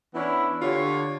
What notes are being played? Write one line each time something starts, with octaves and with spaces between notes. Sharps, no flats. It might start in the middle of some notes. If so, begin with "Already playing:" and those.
E3 B3 C#4 D4 E4
D3 F4 G4 C#5